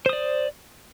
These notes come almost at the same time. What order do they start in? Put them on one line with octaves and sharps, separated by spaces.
C5 D#6 D5